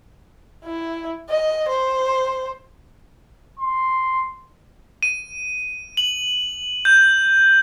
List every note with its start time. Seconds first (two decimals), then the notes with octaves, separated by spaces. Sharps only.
0.65 E4
1.29 D#5
1.69 C5
3.59 C6
5.03 D#7
5.97 F#7
6.85 G6